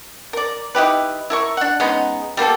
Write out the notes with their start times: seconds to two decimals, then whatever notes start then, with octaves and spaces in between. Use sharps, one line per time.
0.33 A#4 D5
0.75 D#4 E4 G4 B4
1.30 E4 A#4 C#6
1.57 D4 F#5
1.80 G#3 B3 C#4 D#4
2.37 G3 A#3 B3 A4